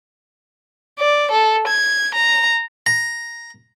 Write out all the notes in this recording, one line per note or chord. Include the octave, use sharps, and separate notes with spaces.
D5
A4
G#6
A#5
A#5